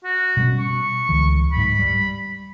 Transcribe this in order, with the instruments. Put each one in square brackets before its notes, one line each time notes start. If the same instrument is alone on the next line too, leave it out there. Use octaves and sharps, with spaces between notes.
[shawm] F#4
[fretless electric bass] B2 G3 C#4
[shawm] C#6
[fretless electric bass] C#2 D3 E3
[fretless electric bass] D1 G#2 [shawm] B5
[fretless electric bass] G3